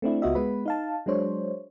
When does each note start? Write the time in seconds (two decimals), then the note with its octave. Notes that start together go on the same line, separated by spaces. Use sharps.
0.02 A3 C4 D4 E4
0.22 C#2 B3 F4 F#4 D#5 E5
0.35 G#3 B3 B4 B5
0.66 D#4 F5 A5
1.06 F#3 G#3 D4 C5 C#5